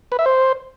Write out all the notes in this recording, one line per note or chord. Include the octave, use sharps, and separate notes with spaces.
B4
E5
C5